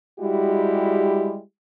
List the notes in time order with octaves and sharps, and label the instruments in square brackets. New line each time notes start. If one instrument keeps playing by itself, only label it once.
[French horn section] G3 G#3 E4 F#4 G4